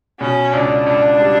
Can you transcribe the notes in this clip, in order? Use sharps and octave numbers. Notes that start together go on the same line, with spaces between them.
B2 C#4
C#2 D4
C#2 D4
G3